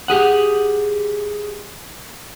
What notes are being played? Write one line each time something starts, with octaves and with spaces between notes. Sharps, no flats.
G4 G#4 F#5